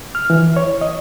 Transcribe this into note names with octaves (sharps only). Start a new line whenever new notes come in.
F6
E3
C#5
D#5